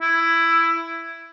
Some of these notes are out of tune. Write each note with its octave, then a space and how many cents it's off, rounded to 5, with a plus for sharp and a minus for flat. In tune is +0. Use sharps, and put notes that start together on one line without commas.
E4 +10